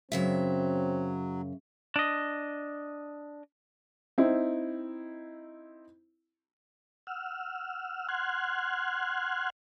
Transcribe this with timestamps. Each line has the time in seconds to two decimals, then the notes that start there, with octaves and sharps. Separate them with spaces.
0.12 F#2 C#3 F#3 C4 E5
1.96 D4 D#5
4.18 C4 D#4 E4
7.07 F#5 E6 F6
8.08 F#5 C6 F6 F#6 G#6